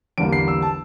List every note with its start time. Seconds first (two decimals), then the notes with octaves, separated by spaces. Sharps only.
0.18 E2 D3 G3 A#3 D7
0.33 C7
0.48 E6
0.62 A5